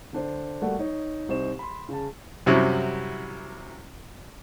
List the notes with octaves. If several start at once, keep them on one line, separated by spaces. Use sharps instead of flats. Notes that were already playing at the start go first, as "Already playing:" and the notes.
D3 D4 C5
G3 A3 A#3 F#4 D5 F#5
D#4 C#5
C2 D#4 C5 C#6 E7
B5 C6
C#3 A5
F#2 C3 G3 C#4 E4 F#4